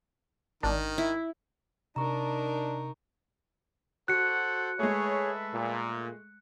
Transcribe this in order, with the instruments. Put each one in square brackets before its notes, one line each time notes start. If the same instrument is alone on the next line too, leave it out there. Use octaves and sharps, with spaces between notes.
[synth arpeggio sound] G#1 D4 [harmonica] D#3
[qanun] E4
[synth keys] C3 [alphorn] D4 [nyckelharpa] D#4 A#4 [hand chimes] A#5 C#6
[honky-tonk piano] F#4 [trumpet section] A4 C5 F#5 [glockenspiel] F#6 C#7
[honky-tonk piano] G#3 A3 [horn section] G#4 C#5 [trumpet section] B4 E5 A5
[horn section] A#2